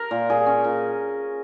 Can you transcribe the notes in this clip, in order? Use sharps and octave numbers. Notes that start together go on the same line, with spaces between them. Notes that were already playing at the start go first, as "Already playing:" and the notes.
Already playing: A#4
A#2
A#2 G#4
C#4
A#2